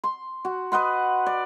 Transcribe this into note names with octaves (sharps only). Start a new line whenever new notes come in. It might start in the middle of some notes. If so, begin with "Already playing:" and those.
C6
F#4
B4 D#5 F#5 C6
D5